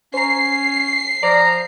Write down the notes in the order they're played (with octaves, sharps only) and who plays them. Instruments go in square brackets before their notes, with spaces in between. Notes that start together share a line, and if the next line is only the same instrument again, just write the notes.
[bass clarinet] C#4 [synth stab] C5 A#5 [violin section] C7
[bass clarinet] F3 [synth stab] D5 [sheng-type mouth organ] A#5